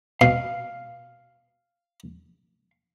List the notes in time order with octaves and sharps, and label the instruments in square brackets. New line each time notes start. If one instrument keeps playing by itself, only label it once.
[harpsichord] B2 [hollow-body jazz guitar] F5